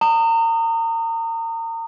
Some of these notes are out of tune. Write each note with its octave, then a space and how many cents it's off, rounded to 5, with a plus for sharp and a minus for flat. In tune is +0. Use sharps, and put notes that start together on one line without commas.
A#5 -35 D#6 -15